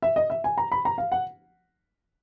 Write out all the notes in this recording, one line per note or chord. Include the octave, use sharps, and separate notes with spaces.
E5
D#5
E5
G#5
A#5
B5
A#5
F5
F#5